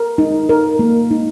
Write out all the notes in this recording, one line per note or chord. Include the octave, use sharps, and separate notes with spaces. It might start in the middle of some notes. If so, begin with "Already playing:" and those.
Already playing: A#4
D#4
A#4
A#3
D#4